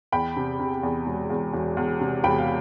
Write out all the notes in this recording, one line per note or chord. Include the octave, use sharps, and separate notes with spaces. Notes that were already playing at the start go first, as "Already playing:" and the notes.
E2 G5 B5
C3
C3
E2
E1
E2
E1
E2
C3
E1 G5 B5
F5